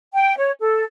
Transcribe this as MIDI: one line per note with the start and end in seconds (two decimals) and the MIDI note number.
0.13 0.35 79
0.37 0.51 73
0.60 0.83 69